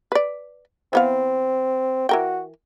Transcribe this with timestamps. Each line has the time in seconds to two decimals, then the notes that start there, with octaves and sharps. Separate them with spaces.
0.12 B4 D5
0.93 E3 B3 C4 F5
2.09 E3 F#4 A#4 G5